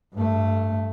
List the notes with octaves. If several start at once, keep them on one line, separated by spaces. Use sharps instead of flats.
G2 A3